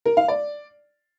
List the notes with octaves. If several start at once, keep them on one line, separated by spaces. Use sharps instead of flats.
A#4
F5
D5